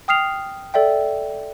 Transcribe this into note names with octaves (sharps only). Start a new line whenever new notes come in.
G5 D#6 F6 C7 F7
A4 D5 E5 G5